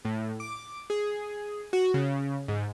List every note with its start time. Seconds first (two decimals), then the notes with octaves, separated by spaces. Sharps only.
0.05 A2
0.40 D6
0.90 G#4
1.73 F#4
1.94 C#3
2.48 G#2